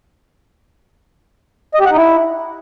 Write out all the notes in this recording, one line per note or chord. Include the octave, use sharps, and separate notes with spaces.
D#5
G4
F#5
D#4
E4